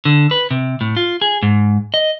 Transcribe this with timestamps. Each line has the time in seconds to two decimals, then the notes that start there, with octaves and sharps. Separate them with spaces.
0.05 D3
0.31 B4
0.51 C3
0.81 A2
0.97 F4
1.22 G#4
1.43 G#2
1.94 D#5